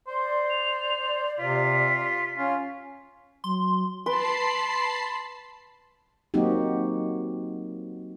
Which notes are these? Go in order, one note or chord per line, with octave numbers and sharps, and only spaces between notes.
C5 D5 C6
F7
C3 F4 B6
C#4 F4 F5
F#3 C6
B4 A5 B5 C6 C7 D7
F#3 A#3 C4 D#4 F#4 G4